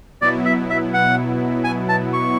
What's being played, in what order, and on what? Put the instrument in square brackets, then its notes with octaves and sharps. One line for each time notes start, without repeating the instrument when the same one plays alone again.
[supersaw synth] B2 F#3 B3 E4 [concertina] D5
[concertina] E5
E5
F#5
G#5
A5
C#6